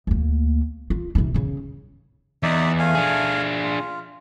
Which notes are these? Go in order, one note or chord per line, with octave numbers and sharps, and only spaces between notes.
D2 A#3
F4
C3 D#4
C#3 C#4
E2 D#4 D5 E5
A3 F5 G#5
D4 G#4
F4